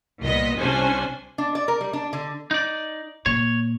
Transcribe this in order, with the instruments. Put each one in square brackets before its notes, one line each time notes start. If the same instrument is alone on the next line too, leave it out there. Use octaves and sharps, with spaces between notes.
[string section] C2 A#2 B3 D#5 B6
C2 C3 C#4 D4 C5 G#5
[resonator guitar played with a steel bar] D4
D5
A#4
G3
D4
D3
[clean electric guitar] D#4 D5
[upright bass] A#2 [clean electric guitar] C#5